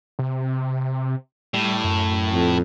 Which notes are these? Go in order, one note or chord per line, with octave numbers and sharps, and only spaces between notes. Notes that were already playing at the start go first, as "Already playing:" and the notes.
C3
A2 G3
F#2
F2